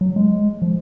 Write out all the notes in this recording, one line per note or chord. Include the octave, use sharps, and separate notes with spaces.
F#3
G#3
F3